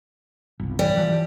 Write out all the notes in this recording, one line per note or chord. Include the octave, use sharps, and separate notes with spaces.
G1 C2
E3 G3
E3 F3